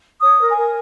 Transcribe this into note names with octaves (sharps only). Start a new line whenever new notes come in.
C#5 D#6
A#4
G#5
A#4